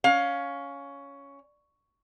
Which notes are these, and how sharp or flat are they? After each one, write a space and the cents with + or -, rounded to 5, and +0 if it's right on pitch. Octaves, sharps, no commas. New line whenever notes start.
C#4 +10 F5 +15